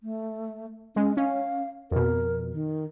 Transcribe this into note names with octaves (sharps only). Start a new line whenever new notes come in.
A3
G#3 C#4
C#4 F5
F2 B2 A#4
D#3